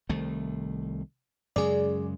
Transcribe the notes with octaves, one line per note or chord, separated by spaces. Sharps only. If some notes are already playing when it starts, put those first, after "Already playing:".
C2 D#3 A3
F#2 C#3 G#3 G#4 D5